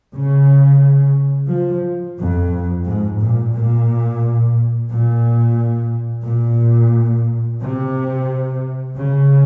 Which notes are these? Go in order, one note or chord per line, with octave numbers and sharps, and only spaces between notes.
C#3
F3
F2
G#2
A#2
A#2
A#2
A#2
C3
C#3